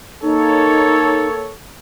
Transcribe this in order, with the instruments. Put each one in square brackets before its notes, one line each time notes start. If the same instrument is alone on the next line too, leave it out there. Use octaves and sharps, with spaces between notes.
[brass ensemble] A#3 A4 C#5 [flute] D#4